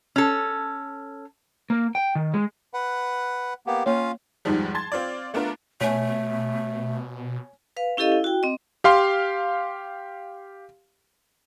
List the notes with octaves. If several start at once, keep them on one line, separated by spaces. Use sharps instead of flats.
C#4 A4
A#3
G5
D#3
G#3
B4 F#5
A#3 B3 G4
A#3 C#4 F4 C#5 F5
E2 G#2 D#3 F3 G3
A5 C6 G#6 A6
C4 F4 D5
A3 B3 D4 F4 A#4
B2 A3 C#5 G#5
B4 F5
C#4 E4 G4 A4 D#5 F5
E4
F#4 G5
C4 D#5
G4 F5 C6